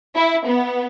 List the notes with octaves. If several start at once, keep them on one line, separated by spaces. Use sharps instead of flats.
E4
B3